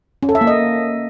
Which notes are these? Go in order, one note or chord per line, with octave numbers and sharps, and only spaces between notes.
C#4
A4
E5
A#3
D#5